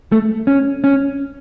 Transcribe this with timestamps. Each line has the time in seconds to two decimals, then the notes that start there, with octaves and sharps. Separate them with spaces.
0.12 A3
0.47 C#4
0.84 C#4